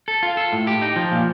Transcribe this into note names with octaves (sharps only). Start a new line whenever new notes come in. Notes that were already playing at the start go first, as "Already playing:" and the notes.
A4
F4
A4
A2
G4
D#4
F3
A#2